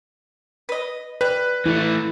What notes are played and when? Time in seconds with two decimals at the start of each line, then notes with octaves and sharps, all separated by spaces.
0.69 B4 D#5
1.21 G3 B4
1.66 E3 A3 E4